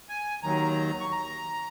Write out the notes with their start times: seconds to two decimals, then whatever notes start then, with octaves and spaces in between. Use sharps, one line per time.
0.09 G#5
0.43 D#2 D#3 F#3 A#5
1.00 C#6
1.12 A#5